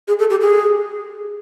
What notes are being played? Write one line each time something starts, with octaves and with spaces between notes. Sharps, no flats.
G#4
A4
G4
G#4